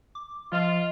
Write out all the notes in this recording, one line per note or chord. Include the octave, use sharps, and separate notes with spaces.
D6
F3 F4 D#5